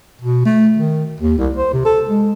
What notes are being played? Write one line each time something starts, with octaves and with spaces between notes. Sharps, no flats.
B2
A3
D#3
D#2
C2
C5
C3
A4
G#3